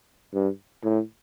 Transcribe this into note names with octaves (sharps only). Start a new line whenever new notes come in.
G2
A2